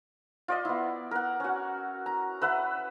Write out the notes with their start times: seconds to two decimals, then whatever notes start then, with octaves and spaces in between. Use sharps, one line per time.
0.48 F4 D5 D#5
0.65 B3 E4
1.11 A#4 F#5
1.40 C#4 F#4
2.06 A#5
2.42 B4 E5 F#5 B5